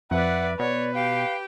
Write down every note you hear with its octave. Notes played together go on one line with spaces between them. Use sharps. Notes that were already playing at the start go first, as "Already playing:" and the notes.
F2 B4 D5 E5 F#5
B2 B4 C#5 D5
G4 F5 G5